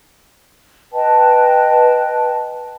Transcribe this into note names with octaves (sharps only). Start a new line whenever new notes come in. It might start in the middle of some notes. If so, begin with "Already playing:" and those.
B4 D#5 G5 A5